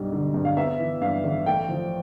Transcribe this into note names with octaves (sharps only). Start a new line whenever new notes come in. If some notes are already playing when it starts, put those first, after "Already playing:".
Already playing: B1 G2 B2 G3
D3
G2
F5
B3 E5
E3
G2 F5
A1
A3 G5
F3